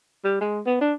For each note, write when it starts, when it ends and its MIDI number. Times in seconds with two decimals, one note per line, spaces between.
0.24 0.36 55
0.41 0.60 56
0.66 0.77 59
0.81 0.93 62